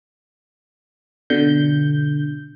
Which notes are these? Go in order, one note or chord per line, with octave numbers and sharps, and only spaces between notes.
B2 D3 G6